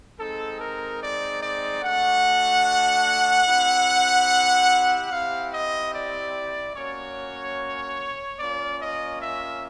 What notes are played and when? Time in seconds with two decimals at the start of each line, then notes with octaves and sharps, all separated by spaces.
0.18 G#3 C4 D#4 A4
0.59 A#4
1.00 D5
1.42 D5
1.82 A3 D4 F#4 F#5
3.47 C4 E4 G4
5.10 C4 E4 G4 F5
5.52 D#5
5.93 D5
6.75 A#3 C#4 F#4 C#5
8.39 A#3 C#4 F4 D5
8.80 D#5
9.21 E5